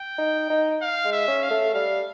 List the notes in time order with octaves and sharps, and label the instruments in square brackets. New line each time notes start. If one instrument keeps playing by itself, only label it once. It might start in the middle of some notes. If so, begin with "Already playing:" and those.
Already playing: [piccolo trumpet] G5
[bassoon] D#4
D#4
[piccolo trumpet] F5
[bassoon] G#3
[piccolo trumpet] E5
[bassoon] C#4
[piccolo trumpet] F5
[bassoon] A3
[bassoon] G3 [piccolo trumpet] F5